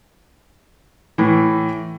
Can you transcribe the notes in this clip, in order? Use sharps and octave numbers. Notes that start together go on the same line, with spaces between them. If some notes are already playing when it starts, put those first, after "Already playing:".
A2 E3